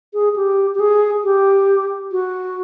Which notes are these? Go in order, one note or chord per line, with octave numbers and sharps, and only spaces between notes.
G#4
G4
G4
G#4
G4
F#4